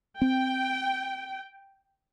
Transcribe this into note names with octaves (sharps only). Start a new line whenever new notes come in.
C4 G5